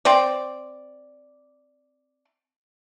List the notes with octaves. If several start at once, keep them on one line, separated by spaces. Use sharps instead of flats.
C4 D5